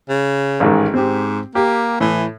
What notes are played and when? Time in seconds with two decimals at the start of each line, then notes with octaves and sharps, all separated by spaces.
0.09 C#3
0.60 A1 G#2 D#3
0.94 G#2 C4 G4
1.55 A#3 G4
2.01 A2 E3